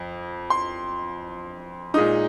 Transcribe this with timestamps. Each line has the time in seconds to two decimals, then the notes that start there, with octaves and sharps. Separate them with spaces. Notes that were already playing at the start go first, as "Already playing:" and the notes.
Already playing: F2
0.50 C6
1.94 A#2 G#3 D#4 D#6